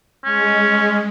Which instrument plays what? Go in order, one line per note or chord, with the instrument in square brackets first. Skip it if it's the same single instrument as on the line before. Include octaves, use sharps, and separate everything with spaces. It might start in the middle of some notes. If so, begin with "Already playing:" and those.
[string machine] G#3 [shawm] C#4